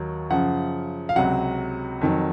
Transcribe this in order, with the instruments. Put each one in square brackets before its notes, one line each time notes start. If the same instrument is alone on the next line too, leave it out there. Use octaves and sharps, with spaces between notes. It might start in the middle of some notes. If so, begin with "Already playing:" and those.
Already playing: [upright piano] D#2 D#3 F#3
F#2 C#3 F3 F#5
F5
C#2 C3 F#3 F#5
F2 D#3 F#3